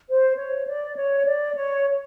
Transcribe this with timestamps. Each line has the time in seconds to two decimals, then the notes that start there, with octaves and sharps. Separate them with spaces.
0.09 C5
0.38 C#5
0.67 D5
0.96 C#5
1.25 D5
1.55 C#5